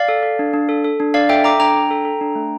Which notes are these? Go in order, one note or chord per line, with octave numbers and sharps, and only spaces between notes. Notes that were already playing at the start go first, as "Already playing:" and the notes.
Already playing: D5 F5
A4
A4
D4
D4
A4
A4
D4
D4 D5 F5
A4 E5 G5
A4 A#5 D6
D4 G5 A#5
D4
A4
A4
D4
A3